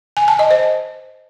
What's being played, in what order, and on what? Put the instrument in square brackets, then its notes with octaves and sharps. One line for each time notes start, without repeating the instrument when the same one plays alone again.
[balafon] G#5
A5
D#5
C5